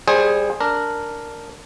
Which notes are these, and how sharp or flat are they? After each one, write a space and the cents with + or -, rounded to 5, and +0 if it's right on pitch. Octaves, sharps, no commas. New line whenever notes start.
G3 +25 G#4 +0 C5 +20
D4 -5 A#4 -5